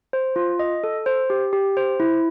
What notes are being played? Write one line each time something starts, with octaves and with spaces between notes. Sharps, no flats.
C5
F4
D#5
A4
C5
G4
G4
C5
E4